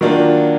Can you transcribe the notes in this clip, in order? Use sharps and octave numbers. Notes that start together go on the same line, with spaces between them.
D#3 F#3 A#3 D4 F4